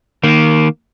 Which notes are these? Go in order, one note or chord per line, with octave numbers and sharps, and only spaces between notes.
D#3 A#3